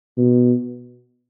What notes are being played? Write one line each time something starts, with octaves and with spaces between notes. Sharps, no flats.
B2